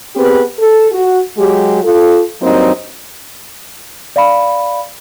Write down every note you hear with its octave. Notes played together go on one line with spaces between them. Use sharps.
B3 C4 G4 G#4 B4
A4
F#4
F#3 G#3 G4
F4 A4
G2 F#3 A#3 C4 D#4
D5 F5 B5